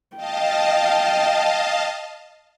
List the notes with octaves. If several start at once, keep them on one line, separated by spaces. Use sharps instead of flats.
D#5 F5 G5 A5